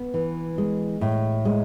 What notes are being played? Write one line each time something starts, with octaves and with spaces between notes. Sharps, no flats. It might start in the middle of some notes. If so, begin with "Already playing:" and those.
Already playing: B3
E3
G#3
A2
G#3